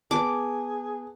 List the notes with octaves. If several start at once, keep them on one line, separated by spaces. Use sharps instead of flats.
B3 G#4 A5 D6